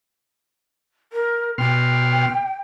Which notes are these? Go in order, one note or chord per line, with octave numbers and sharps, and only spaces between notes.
A#4
B2 G5 C6 F6